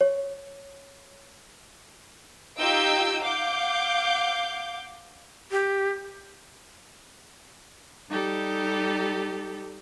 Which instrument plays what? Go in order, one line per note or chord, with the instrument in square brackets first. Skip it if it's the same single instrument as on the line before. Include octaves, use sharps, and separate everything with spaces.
[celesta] C#5
[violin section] D#4 F4 G4 E6 G6 D7
F5 F#5 D6 G6
[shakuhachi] G4
[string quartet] G3 D#4 G4 A4